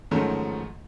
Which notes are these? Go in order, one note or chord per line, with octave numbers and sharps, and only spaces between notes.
G#2 D#3 F3 F#3 A3 C#4